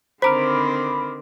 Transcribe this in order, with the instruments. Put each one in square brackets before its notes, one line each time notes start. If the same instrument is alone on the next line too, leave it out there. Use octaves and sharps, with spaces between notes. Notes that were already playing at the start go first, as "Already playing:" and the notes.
[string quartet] D3 D#3 C4 [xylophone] C5 A#5 [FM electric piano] B5 D6 F6